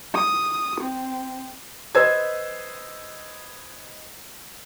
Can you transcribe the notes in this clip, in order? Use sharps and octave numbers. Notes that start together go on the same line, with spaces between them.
D#6
C4
B4 C5 D#5 E6 G#6